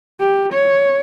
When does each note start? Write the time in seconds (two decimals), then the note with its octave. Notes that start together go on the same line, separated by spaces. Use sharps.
0.20 G4
0.53 C#5